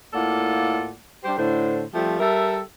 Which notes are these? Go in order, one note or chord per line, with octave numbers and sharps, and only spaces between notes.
A2 A#3 F4 A4 D5 F#5
G3 D4 G4 C5
A2 D3 C5
F3 G3 A3 C4 G4
G3 A4 A#4 E5